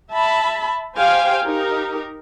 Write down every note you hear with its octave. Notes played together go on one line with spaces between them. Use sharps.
E5 A5 B5
G4 C5 F5 G5 G#5
D#4 G4 A#4